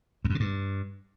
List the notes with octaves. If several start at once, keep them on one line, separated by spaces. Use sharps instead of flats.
E2
F#2
B2
G2